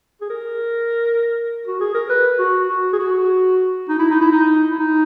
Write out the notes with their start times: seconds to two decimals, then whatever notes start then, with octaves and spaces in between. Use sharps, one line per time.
0.21 G#4
0.30 A#4
1.67 F#4
1.81 G#4
1.95 A#4
2.09 B4
2.39 F#4
2.68 F#4
2.93 G#4
2.99 F#4
3.89 D#4
3.99 E4
4.11 D#4
4.21 E4
4.32 D#4
4.71 E4
4.79 D#4